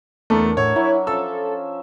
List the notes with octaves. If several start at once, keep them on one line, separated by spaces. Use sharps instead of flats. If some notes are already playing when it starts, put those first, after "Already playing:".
E2 A3 D4 A4 A#4
A2 C#5 E5 F#5
F#3 E4
F3 C#4 A4 E5 E6